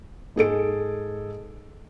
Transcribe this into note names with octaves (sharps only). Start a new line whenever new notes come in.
G#2 G#4 A4 D7